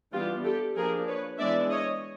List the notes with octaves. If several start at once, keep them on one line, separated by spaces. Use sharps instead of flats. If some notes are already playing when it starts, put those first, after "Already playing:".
E3 G3 B3 D4 F4 G4
G4 A4
F3 A#3 D4 G#4 A#4
B4 C#5
E3 G#3 B3 D4 D5 E5
C#5 D#5